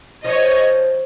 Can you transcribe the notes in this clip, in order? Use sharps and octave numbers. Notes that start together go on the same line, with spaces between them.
F3 C#5 D#5